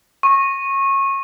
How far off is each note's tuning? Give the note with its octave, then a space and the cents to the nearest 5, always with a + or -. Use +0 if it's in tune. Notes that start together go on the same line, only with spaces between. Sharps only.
C#6 -25